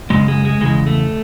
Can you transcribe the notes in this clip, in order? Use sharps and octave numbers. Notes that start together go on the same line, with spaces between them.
F#2 C#3 G#3
G#3
G#3
E2 C#3 G#3
A3